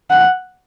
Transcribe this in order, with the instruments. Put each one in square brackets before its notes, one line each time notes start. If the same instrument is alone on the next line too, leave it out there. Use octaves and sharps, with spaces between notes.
[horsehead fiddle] F#5